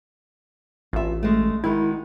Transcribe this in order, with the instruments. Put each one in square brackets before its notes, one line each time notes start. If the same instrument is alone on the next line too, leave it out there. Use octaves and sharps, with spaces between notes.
[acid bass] A1 [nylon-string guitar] F4 E5
[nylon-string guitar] G#3 A3
[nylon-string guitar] D#3 G#3 F#4 [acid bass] E4